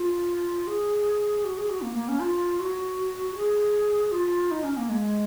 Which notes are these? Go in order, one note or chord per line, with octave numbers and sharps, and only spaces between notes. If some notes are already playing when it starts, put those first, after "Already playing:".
Already playing: F4
G#4
F#4
G#4
F#4
A#3
A#3
C#4
F4
F#4
G#4
F4
D#4
C#4
A#3
G#3